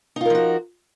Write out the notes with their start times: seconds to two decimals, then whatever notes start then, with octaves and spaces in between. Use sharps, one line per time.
0.16 D#4
0.21 F4
0.25 A#4
0.30 F3
0.35 F#4